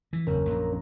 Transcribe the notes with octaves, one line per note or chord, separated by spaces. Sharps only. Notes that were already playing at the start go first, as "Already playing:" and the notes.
E3
F#1 E2 C#4 A#4
A#1 F#2